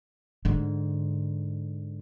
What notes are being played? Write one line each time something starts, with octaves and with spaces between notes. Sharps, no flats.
G#2 D3